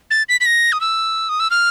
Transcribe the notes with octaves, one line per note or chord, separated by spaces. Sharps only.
A6
B6
B6
A#6
D#6
E6
D#6
E6
F6